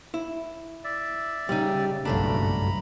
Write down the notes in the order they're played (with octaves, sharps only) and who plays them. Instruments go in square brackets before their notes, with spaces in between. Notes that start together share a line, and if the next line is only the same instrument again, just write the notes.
[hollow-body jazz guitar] E4
[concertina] D5 E5
[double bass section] C#3 [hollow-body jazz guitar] G3 D#4
[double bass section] F#1 B1 F#3 [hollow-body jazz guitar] G2 A3 D4 [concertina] A#5 B5